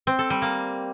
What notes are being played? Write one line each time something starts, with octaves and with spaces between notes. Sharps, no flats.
C4
A4
G3
A#3